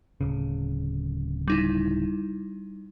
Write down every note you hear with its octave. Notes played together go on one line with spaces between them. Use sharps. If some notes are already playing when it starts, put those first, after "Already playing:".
D1 C#3
G3 D#4 E4